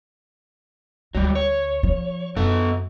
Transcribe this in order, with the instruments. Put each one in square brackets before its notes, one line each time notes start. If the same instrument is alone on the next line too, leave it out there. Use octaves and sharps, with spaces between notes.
[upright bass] D2 [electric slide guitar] F#3 G3
[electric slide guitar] C#5
[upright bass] F3
[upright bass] F#2 [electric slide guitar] B3 A4